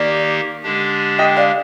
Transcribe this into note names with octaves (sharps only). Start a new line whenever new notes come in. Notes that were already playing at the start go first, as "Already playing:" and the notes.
Already playing: D#3 A#3 D#4 G4 D5
D3 G#3 D4 G4
D#5 G5
D5 F5